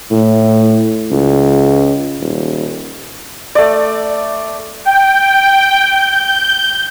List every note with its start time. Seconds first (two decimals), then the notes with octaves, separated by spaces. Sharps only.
0.11 A2
1.11 C#2
2.21 D#1
3.55 A3 D5
4.85 G5
5.82 G6